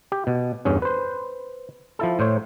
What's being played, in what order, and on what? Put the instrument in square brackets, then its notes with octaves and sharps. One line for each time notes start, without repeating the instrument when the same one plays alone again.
[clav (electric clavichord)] G4
B2
E2 G2 C#4
B4 C5
F3 E4 A4
A2 C5 C#5